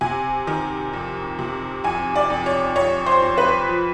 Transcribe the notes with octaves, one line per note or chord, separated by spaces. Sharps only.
C3 G#5
D#3
F2
C3
F2 G#5
D5
F2
C#5
F2 C#5
C5
F2
B4
F3